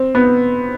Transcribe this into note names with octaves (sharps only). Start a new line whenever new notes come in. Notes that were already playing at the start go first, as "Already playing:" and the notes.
Already playing: C4
B3